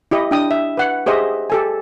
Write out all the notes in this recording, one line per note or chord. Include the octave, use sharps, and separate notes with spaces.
E4 G4 D#5
D4 G5 D#6
E5
B4 F#5
G4 G#4 C5 D#5 E5
G4 A4 G#5